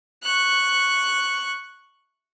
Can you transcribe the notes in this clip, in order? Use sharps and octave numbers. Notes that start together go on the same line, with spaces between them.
C#6 F#6